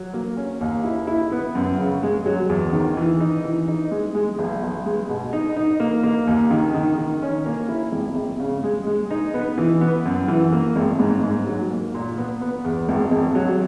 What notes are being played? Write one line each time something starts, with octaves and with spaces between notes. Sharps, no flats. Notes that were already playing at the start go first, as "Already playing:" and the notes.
Already playing: F#3
A#3
C#4
D#2
E4
E4
B3
F#2
C#3
G#3
F#3
E2
D#3
E3
D#4
E3
D#4
G#3
G#3
B1
B1
G#3
B2
D#4
D#4
A#3
A#3
D#2
D#3
D#3
D#3
C#4
A#3
E4
G#1
G#1
C#3
G#3
G#3
D#4
B3
E3
B3
F#2
E3
A#3
G#1
G#2
G#2
F#3
A#3
A#2
B3
B3
E2
G#1
G#1
F#3